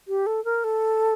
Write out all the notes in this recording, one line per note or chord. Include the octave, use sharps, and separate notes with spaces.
G4
A4
A#4
A4